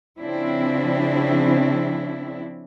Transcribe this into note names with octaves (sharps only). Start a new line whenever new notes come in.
C#3 F3 C4 D4 E4